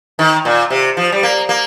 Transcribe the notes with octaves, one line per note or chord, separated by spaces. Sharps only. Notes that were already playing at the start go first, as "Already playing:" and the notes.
D#3
A#2
C3
F3
G3
A#3
A#3